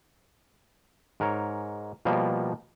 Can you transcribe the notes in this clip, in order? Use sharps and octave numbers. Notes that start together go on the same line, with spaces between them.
G#2 A#4 C#5
B2 F3 G3 A#3